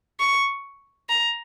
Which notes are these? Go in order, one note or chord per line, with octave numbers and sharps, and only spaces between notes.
C#6
A#5